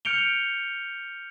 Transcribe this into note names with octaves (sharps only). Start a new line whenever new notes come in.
F6 G6 C#7 D7 F7 G7